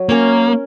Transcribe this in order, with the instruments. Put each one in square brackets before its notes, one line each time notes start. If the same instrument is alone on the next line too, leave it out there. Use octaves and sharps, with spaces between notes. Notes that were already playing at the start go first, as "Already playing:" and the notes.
Already playing: [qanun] F#3
[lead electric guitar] A#3 [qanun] C#4 A#4 C#5